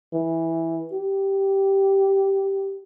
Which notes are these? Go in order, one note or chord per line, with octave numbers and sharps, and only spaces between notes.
E3
G4